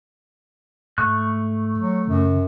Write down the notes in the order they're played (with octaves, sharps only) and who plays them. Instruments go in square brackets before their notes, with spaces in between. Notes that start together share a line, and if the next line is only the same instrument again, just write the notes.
[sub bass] G#2 [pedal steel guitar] A3 C#6 F#6
[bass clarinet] F#3
[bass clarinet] F#2 [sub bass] C#3